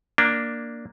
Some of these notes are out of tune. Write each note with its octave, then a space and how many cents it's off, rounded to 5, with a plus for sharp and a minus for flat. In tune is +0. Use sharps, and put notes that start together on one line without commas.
A#3 +0 D4 +0